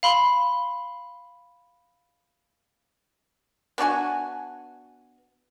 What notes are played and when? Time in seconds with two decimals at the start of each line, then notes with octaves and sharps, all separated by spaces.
0.03 F5 B5 C6
3.78 B3 D4 F#4 G#5